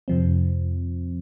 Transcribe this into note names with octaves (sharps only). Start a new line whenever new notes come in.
F2 C3 F3 C4